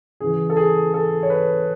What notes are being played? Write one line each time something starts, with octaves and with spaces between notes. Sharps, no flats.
C#3 E3 G#4
A4
G#4
A4
C#5
B4